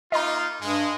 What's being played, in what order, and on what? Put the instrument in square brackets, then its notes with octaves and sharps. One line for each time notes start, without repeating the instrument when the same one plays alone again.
[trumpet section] A#3 D#4 F4 [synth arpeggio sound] D#5 A#5
[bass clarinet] G2 [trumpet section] G#3